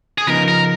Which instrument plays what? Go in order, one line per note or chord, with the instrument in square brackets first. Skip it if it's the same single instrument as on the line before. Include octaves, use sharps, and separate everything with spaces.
[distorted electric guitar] G#4
[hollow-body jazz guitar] C#3 F3 B3 D#4 [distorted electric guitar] A#4
[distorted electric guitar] A#4